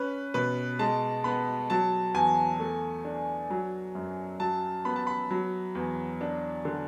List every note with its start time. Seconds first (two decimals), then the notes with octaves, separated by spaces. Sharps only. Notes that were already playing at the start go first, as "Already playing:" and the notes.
Already playing: C#4 B4
0.34 B2 B4
0.79 G#3 A5
1.24 B3 B5
1.70 F#3 A5
2.14 E2 G#5
2.60 A3
3.05 D4
3.50 F#3
3.95 F#2
4.40 F#3 A5
4.85 B3 B5
4.96 A5
5.07 B5
5.31 F#3
5.75 E2
6.21 D4
6.65 D3